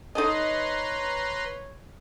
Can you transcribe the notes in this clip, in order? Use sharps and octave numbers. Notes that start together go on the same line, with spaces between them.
D#4 A4 B4 C#5 D#5 A#5 C6